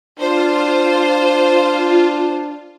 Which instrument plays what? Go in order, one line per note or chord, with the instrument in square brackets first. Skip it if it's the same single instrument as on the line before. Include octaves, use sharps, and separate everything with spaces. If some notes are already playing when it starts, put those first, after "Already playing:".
[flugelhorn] D4 [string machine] F4 [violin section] C5